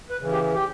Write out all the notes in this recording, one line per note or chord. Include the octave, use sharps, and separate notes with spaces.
B4
C#3 E3
G4
G4